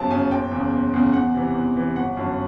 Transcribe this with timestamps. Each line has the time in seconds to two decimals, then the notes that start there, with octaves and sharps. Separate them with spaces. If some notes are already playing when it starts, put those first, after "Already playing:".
Already playing: G1 F#2 C#3 A5
0.11 F#2 C#3 G#5
0.31 F#1 G5
0.51 E2 C#3
0.73 F#1
0.93 E2 C#3
1.13 E2 F#5
1.34 C3 E3
1.54 E2
1.75 C3 E3
1.96 G1 F#5
2.17 F#2 D3